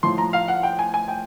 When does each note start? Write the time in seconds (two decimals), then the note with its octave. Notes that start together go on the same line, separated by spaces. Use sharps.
0.03 A2 F3 C6
0.18 A#5
0.33 F5
0.48 F#5
0.63 G5
0.79 G#5
0.94 G#5
1.08 G5